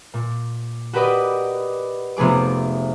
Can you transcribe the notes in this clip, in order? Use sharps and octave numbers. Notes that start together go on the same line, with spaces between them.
A#2
F#4 G4 A#4 B4 D5 D#5
F1 C3 B3 G#4 D6